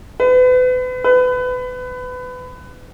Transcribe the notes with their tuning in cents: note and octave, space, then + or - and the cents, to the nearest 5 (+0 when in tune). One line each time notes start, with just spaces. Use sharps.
B4 +35
B4 +25